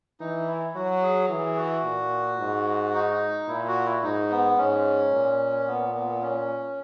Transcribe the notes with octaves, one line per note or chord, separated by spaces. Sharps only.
E3 D#4
E4
F#3 F#4
G#4
E3 G#4
F#4
A#2
G#2
D#4
A#2 E4
F#4
E4
G#2 D#4
B3
G#2 C#4
A#2
B3
B3
C#4